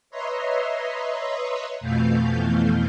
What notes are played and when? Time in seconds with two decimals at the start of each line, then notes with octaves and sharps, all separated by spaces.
0.10 B4 C#5 D#5 E5 A#5 C6
1.80 F2 B2 E3 A3 F5 G6